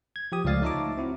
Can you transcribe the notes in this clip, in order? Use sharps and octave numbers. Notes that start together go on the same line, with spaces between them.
G#6
F3 G4 D#6
C#2 F3 A3 D5 F5 A6
D#4 C#5 E5 A5 A#5 D6
C4 E4 F#4